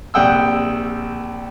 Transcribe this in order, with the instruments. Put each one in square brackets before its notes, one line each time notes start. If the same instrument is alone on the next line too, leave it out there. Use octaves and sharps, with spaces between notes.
[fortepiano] A#1 C3 F#5 G5 D#6 E6